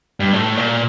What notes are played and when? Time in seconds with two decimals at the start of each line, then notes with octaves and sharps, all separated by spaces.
0.20 G2
0.33 A2
0.57 A#2